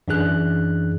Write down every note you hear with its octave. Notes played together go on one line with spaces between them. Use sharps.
F#2 E3 D4 G#4 F#6